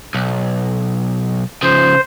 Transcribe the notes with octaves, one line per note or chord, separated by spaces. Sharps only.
B1
C#3 F3 C5